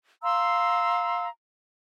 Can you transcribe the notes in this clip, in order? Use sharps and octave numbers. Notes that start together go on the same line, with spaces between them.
F5 A#5 C6 E6